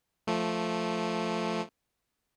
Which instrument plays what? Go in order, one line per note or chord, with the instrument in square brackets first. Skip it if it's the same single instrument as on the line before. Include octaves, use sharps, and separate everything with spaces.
[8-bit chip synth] F3 A3